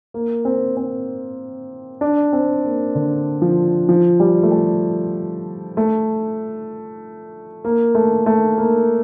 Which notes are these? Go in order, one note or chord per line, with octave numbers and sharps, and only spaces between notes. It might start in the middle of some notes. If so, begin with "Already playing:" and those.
A#3
C4
C4
D4
C4
A#3
D3
F3
F3
G3
A3
G3
A3
A#3
A3
A3
A#3